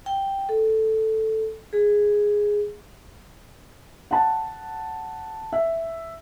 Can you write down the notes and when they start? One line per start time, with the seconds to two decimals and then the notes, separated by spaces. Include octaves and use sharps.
0.06 G5
0.49 A4
1.73 G#4
4.11 F#5 A5
5.52 E5